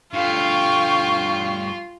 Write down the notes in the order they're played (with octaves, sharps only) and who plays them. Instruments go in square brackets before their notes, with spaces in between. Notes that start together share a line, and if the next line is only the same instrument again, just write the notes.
[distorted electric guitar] G2 A3 [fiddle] F4 [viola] F5 G5 [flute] C#6